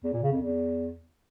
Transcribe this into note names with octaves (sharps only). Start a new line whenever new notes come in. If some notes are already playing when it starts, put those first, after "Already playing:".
E2
A#2
C#3
F2
E2